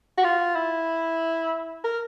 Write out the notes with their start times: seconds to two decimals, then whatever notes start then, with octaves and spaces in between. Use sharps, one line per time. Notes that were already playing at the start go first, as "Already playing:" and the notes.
0.17 F#4
0.24 F4
0.55 E4
1.84 A#4